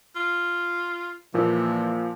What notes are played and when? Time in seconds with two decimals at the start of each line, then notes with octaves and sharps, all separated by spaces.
0.16 F4
1.34 A#2 E3 F3 A#3